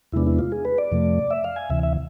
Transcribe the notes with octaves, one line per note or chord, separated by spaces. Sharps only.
E2 C3 G#3 B3 D4 E4
E4
F4
G#4
B4
D5
F2 C3 F3 A3
E5
F5
G#5
D2 C3 E3 E5
E5